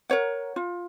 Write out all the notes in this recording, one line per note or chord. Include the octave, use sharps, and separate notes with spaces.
A#4 C#5 F#5
F4